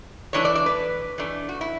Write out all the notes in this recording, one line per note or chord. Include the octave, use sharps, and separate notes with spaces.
E3 A3 D4 C#5
D5
D5
B4
E3 A3 D4
F#4
E4